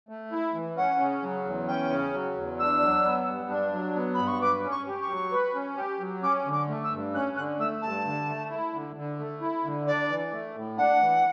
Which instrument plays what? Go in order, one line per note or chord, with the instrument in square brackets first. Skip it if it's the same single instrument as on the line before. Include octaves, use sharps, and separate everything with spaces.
[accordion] A3
E4
E3
[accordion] C#4 [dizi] F#5
[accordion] C#3
F#3
E2
[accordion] C#4 [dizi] G5
[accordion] C#3
F#3
E2
[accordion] D4 [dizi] E6
[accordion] F#3
B3
G2
D4
F#3
B3
[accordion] G2 [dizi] B5
[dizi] C#6
[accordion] B4 [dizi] D6
[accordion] C#4
[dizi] C#6
[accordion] G4
[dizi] C#6
[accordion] F#3
B4
C#4
G4
F#3
[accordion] C#4 [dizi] D6
[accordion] D3
[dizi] D6
[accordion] A3
[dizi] E6
[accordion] G2
[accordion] C#4 [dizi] F#6
[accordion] D3 [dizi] F#6
[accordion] A3 [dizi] E6
[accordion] G2 [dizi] A5
[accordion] D3
A3
E4
D3
D3
A3
E4
D3
[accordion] D4 [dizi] D5
[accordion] E3
A3
A2
[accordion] D4 [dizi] F#5
[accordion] E3